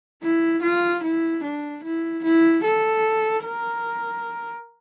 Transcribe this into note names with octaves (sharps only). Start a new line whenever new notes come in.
E4
F4
E4
D4
E4
E4
A4
A#4